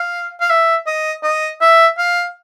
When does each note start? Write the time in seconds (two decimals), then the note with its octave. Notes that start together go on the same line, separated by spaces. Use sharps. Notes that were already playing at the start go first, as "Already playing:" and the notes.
Already playing: F5
0.41 F5
0.50 E5
0.87 D#5
1.24 D#5
1.61 E5
1.98 F5